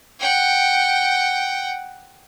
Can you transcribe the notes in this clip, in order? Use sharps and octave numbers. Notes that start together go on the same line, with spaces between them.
F#5 G5